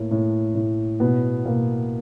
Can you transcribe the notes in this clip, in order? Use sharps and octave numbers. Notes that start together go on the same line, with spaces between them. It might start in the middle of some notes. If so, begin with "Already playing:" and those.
Already playing: A2 A#3
A2
A2
B2 B3
B2 A#3